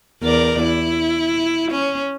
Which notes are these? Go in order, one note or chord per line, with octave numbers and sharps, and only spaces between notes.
E2 A#4 D5
E4
C#4